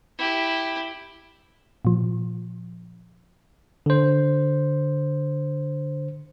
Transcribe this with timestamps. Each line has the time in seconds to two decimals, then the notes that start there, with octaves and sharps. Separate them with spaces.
0.18 E4 G4
1.85 A#2 F3
3.86 D3 C5